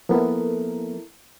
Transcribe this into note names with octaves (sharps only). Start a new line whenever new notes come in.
F3 A#3 B3 E4 A4 A#4